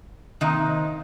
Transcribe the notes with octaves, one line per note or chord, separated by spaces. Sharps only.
C3 D#3 A#3 D#4